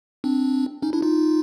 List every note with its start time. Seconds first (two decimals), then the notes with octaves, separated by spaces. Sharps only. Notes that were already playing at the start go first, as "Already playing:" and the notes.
0.24 C4 D4
0.82 C#4 D#4
0.93 D4 E4
1.02 D#4 F4